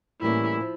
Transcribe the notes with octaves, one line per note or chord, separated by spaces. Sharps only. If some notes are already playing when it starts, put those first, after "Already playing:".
A2 E3 G3 A#3 C#4 E4
F3